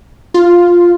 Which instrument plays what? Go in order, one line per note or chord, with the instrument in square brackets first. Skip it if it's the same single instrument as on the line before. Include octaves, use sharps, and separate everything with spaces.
[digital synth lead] F4